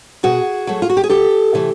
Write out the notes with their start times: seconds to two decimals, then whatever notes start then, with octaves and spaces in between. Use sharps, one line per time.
0.23 B2 F#4 G#4
0.67 F#3 A3
0.82 F4
0.89 F#4
0.97 G4
1.04 G#4
1.10 D2 G4 A4
1.54 C3 E3 A3